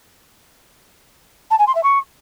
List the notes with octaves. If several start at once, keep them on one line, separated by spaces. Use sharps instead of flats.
A5
G#5
C6
E5
C#6